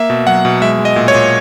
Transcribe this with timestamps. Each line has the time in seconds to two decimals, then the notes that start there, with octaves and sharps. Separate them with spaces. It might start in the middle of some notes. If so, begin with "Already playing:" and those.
Already playing: A#3 E5
0.10 B2
0.27 F#3 F#5
0.45 B2
0.62 G#3 E5
0.79 G#3
0.85 D#5
0.96 A#2
1.08 C#5
1.14 A#2